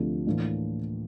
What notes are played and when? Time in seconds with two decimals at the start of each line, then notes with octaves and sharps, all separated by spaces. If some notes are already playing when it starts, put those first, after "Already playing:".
Already playing: D2 C3 F3 A3 D4
0.27 A2 E3 A#3 D4